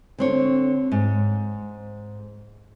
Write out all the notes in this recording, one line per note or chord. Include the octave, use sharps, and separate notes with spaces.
D3 C4 C#5
G#2